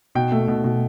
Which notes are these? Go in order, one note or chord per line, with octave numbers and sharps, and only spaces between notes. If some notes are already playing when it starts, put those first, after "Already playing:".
B2 G5
A3
B2
B2